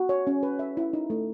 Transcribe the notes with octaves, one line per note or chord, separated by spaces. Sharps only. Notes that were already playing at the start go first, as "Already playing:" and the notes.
Already playing: F#4
C#5
C#4
B4
E5
E4
D#4
A3